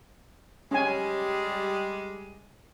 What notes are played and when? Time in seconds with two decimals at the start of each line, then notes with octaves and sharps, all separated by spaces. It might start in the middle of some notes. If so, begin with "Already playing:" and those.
0.71 G3 G#3 C#4 G#5